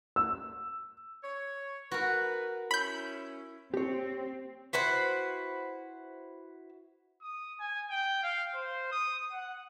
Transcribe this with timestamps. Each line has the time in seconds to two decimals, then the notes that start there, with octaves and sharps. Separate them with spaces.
0.16 E6
1.23 C#5
1.91 F#4 A#4 B4
2.71 C#4 E4 B5 G6
3.74 C4 G4 C#5
4.73 E4 F#4 B4 C5
7.22 D#6
7.59 G#5
7.90 G5
8.23 F5
8.55 C5
8.92 D#6
9.32 F#5